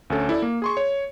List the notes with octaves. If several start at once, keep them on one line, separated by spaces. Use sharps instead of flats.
D2 C#4 A4
E4 A4 D5
A#3
G#4 C6 C#6
C#5